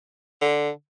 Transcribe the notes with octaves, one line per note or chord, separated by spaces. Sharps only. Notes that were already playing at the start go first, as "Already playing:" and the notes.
D3